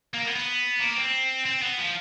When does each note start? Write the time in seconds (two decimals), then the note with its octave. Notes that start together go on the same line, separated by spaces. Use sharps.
0.14 A#3
0.25 B3
0.36 B3
0.80 A#3
0.96 C4
1.46 C4
1.62 B3
1.78 F3